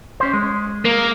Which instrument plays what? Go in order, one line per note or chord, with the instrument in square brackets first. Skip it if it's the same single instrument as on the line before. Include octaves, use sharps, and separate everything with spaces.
[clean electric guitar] C#4 C5
G#3
[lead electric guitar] A#3